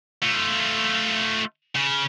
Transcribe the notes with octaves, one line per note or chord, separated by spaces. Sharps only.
A3 F4
C#3